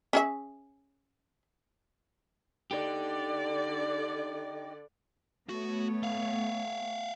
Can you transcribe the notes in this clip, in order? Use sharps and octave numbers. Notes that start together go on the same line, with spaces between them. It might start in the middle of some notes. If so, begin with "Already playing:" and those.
C#4 G#4 E5
D3 D#4 G4 D5
A3 B3 F#4 C#5
E5 F5